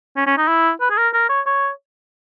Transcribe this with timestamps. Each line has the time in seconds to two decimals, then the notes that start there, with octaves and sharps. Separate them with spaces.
0.16 C#4
0.27 C#4
0.38 D#4
0.48 E4
0.81 B4
0.90 G#4
0.97 A#4
1.14 A#4
1.29 C#5
1.46 C#5